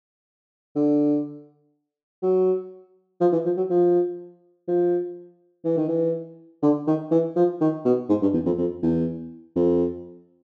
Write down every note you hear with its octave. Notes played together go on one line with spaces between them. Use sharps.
D3
F#3
F3
E3
F3
F#3
F3
F3
E3
D#3
E3
D3
D#3
E3
F3
D#3
B2
G#2
G2
E2
F2
F2
E2
F2